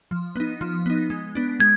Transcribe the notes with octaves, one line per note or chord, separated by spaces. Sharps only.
F3
B3 D#4
F3
B3 D#4
G#3
B3 D4
G#3 G#6